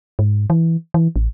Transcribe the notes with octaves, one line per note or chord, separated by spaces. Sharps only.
G#2
E3
E3
A1